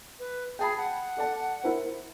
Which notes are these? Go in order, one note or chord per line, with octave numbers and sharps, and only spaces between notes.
B4
G#4 G5 A5 B5
F#5
A4 D5 A5
E4 A#4 C5